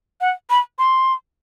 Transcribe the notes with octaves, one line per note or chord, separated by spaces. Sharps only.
F#5
B5
C6